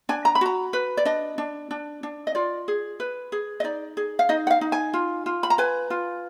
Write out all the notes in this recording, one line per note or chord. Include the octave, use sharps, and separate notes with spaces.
D4 G#5
A#5
B5
F#4 A#5
B4
D5
D4 D#5
D4
D4
D4
D#5
F4 D5
G#4
B4
G#4
D#5
D#4 D5
G#4
F5
D#4 D#5
F#5
F5
D#4
G#5
F4
F4
B5
A#5
B4 G#5
F4